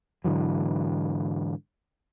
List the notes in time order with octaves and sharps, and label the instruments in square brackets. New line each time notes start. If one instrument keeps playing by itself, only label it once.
[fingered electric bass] G#2 D3 E3 F#3